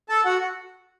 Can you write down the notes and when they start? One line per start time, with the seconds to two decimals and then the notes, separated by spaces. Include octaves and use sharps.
0.09 A4 A5
0.25 F#4 F#5